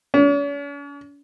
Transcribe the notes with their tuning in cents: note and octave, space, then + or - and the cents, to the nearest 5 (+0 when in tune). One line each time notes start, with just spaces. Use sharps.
C#4 +45